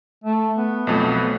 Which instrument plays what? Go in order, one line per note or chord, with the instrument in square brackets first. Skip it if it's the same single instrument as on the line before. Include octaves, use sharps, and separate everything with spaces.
[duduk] A3
B3
[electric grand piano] B1 F2 A3